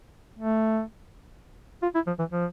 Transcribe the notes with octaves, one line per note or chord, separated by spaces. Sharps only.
A3
F4
E4
F3
E3
F3